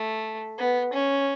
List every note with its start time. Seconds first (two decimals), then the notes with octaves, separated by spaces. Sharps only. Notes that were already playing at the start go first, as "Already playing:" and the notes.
Already playing: A3
0.58 B3
0.93 C#4